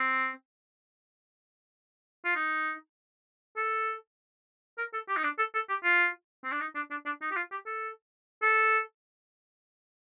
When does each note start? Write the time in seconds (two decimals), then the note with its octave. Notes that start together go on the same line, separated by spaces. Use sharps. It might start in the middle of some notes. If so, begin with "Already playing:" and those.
Already playing: C4
2.25 F4
2.36 D#4
3.57 A4
4.78 A#4
4.94 A4
5.09 G4
5.17 D#4
5.24 D4
5.38 A4
5.55 A4
5.69 G4
5.84 F4
6.44 C4
6.52 D4
6.60 D#4
6.75 D4
6.91 D4
7.06 D4
7.21 D#4
7.31 G4
7.36 F4
7.51 G4
7.66 A4
8.42 A4